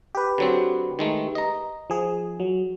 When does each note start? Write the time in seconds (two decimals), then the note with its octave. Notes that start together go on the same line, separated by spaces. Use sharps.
0.15 G4 B4
0.38 D3 F#3 C4
0.99 D#3 G#3 A3
1.35 D#5 A#5
1.90 F3 G#4
2.40 F#3